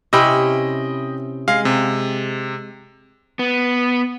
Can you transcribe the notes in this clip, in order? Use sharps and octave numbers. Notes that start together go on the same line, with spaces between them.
C3 C#4 E4 D#5 G5 B5
G#3 F5
C3
B3